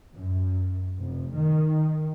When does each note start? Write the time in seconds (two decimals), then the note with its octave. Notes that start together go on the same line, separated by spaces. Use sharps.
0.15 F#2
0.99 F1
1.35 D#3